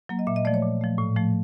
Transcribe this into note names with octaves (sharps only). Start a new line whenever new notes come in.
F#3 A#3
D#5
A#2 E5
D#5
F3 A3 D5
C#5
A#2
F3 A3
A2
F3 A3